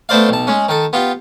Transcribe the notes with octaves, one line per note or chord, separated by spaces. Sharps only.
A3 B3 D4 C5 D5 F5
B1 A5
G#3 C#4
D#3 A4
B3 F4 G4